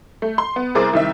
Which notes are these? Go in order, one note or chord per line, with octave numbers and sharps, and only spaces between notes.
A3
C6
B3
C2 G#4 A#4 C5 D6 A6
C2 D#3 E5